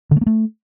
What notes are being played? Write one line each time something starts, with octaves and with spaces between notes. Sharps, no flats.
D3
A3
A#3
A3